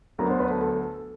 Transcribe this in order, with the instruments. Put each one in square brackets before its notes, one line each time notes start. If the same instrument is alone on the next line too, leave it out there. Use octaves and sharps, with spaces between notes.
[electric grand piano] D2 D3 F#3 B3 D4 [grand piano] A#4 A#5
[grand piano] C5 C6
B4 B5
A4 A5
A4 A5